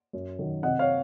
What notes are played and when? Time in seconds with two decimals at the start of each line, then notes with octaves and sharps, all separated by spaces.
0.13 F#2
0.39 D#3 F#3
0.63 C3 D#5 F#5
0.79 C#5 F5